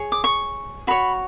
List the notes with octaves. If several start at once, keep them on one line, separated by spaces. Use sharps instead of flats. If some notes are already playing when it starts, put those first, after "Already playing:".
Already playing: G#4 C#5
D6
C#6
F#4 C#5 B5